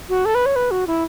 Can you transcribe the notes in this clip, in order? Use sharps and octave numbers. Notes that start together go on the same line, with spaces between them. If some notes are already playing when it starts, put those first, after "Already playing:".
F#4
A4
B4
C#5
B4
F#4
E4